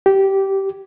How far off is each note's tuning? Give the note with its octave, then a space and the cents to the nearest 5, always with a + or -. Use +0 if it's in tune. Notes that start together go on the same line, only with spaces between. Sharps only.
G4 -15